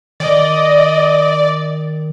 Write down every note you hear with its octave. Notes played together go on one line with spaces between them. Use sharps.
D#3 D5 D#5